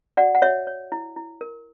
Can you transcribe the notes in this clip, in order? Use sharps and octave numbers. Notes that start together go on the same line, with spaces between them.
F#4 D5 F#5
F#5
F#4 C#5 E5
C#5
E4
E4
A#4